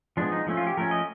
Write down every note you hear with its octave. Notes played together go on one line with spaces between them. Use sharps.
F3 G#3 B3 D4
D#4
F3 A3 C#4
F4
G4
F3 A3 C#4 A#4
D#5